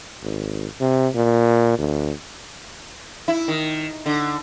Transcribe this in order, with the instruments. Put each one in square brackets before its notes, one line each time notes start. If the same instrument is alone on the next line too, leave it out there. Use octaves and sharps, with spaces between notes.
[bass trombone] G#1
C3
A#2
D2
[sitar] E4
D#3
D3